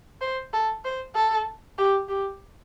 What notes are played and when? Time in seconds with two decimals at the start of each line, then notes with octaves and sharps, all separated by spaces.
0.21 C5
0.53 A4
0.84 C5
1.15 A4
1.78 G4
2.09 G4